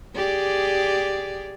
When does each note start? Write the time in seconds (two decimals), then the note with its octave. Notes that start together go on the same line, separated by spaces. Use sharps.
0.16 G4 G#4 D5